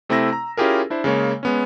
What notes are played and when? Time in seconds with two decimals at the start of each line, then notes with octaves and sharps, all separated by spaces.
0.09 C3 A3 C4 E4 E6 A#6
0.33 A#5
0.57 C#4 E4 F4 G4 G#4 A#4
0.90 D4 E4 C5
1.04 C#3 G#3 A#3 C#5
1.43 G#3 B3 C#4